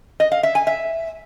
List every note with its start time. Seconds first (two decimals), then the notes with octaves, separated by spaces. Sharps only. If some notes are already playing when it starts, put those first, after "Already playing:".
0.20 D#5
0.32 F5
0.43 E5
0.55 G#5
0.67 E5